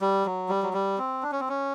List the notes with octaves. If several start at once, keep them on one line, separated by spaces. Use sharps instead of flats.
G3
F#3
G3
F#3
G3
C4
D4
C#4
C4
C#4